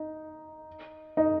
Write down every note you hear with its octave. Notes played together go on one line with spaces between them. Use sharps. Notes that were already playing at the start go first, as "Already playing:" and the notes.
Already playing: D#4
D#4